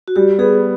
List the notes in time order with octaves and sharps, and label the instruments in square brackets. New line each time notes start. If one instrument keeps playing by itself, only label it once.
[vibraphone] F#4
[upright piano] G3 [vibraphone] G4
[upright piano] B3 [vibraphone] G#4